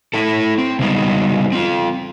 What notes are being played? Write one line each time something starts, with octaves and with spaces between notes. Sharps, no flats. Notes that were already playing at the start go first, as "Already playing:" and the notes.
A3 E4 A4
C4
C#3 G3 G#3 B3 D#4 F#4
C4 F4